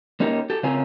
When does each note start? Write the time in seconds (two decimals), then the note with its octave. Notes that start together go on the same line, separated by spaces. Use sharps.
0.20 A#3 C#4 D#4 G4 A#4
0.50 G4 A4
0.63 C#3 C4 C#4 F4 A#4 G#5